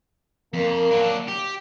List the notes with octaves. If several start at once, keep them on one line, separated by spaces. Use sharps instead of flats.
F2 A#3
F#3 D4
G4